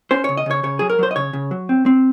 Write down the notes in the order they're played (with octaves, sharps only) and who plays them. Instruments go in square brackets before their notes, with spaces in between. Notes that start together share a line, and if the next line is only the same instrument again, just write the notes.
[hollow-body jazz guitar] C#4 C5
C#3 C#5
D#5
C#3 C#5
C#3 C#5
F#3 G#4
A#4
F#3 C5
D#5
C#3 C#5
C#3
F#3
C4
C4